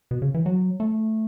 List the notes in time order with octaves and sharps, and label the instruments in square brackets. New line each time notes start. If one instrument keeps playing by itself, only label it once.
[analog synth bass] B2
C#3
E3
F#3
A3